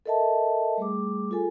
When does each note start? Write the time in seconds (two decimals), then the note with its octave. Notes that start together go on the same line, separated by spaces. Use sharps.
0.06 A4 A#4 D#5 E5 A5
0.77 G3 A3 G#4 D6
1.31 F4 G#4 A4 G#5